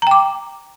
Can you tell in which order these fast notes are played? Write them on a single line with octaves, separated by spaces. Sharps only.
A#5 G5 D6